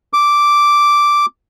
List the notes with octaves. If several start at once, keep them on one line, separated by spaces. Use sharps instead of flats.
D6